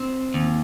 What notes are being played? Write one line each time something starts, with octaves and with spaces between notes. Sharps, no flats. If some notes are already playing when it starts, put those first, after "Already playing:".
Already playing: C4
D#2